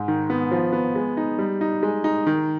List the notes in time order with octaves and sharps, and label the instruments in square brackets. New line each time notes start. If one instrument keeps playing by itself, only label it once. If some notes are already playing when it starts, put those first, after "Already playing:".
Already playing: [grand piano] G#2
D#3
B3
F3
B3
G#3
D#4
G3
D#4
G#3
D#4
D#3